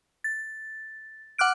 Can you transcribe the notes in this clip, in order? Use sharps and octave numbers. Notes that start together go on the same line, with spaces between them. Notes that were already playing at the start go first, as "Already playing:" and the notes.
A6
F#5 D6 F6 F#6 D7